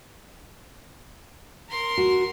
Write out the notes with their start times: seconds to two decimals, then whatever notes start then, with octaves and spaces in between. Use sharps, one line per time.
1.68 A#4 C6
1.98 F#4